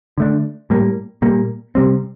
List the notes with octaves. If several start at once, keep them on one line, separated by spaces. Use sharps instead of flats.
D3 A3 D4
A2 G3 A#3
A#2 G3 A#3
C3 G3 C4